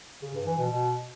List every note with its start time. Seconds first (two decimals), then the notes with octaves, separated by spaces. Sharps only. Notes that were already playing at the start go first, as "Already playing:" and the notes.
0.22 C#3
0.34 G2
0.46 E3
0.58 B2
0.70 B2